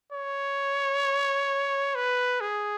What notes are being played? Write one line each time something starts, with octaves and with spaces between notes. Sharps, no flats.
C#5
B4
G#4